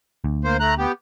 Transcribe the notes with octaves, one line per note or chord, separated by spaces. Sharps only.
D2
A#3 C5
A3 A#5 F#6
B3 G4